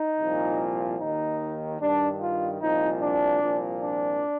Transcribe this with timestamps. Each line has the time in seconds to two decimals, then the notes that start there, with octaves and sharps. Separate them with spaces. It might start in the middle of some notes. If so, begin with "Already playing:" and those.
Already playing: D#4
0.19 C2 A#2 F3
1.00 D#2 D#3 D#4
1.81 G2 D#3 D4
2.21 F4
2.61 C2 A#2 F3 D#4
3.01 D4
3.41 C2 A#2 F3
3.81 D4